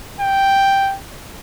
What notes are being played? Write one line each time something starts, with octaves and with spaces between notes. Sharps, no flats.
G5